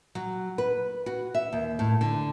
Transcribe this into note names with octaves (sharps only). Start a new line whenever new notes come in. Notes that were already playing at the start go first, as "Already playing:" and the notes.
F#3
B4
F#4
E5
D#2
A2
D3